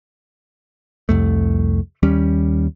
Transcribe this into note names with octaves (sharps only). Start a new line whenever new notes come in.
C2 F2 A3
D#2 G3 C#4